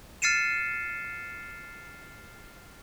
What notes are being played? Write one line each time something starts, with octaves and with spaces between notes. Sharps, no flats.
F6 A6 C7 C#7 D#7 E7